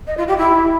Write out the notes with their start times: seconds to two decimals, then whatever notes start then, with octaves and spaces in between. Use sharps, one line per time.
0.07 D#5
0.18 F4
0.28 G4
0.38 E4